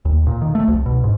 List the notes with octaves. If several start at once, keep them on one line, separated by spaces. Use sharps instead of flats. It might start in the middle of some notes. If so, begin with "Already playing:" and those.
D#2
A#2
D#3
A3
C2
B2
G#2